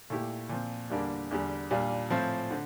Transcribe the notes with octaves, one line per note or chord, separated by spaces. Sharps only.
A#2 A3 E4 G4
A#2 F3 C4
E2 D3 G3 A#3 D4
E2 D3 G3
A#2 G3 D4 F4
A2 F3 C4 F4
D3